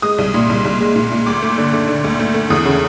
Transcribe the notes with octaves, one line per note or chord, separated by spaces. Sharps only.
G#3 D#6
C2
A#2
C2
C2
G#3
A#2
A#2
D2 D6
A3
D3
D3
D3
D2
A3
A3
E2 D#6
C#3